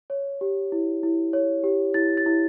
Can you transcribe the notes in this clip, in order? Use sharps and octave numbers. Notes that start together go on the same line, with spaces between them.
C#5
G4
E4
E4
C#5
G4
E4 A6
A6
E4